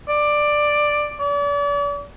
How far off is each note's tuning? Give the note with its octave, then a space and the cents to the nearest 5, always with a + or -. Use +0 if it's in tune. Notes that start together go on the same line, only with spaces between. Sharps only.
D5 +10
D5 -40